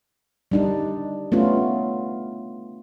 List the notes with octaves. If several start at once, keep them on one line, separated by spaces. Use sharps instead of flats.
G3 D4 D#4
A3 B3 C#4 F4